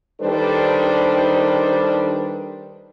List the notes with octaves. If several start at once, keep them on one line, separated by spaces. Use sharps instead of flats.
D#3 G3 D4 A4 B4 C5